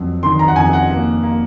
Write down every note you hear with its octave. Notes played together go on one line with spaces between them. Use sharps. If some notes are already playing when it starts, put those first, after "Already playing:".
Already playing: F2 F#3
D#3 C6
A#5
F#5
F2 G#5
F#5
A#3
A#3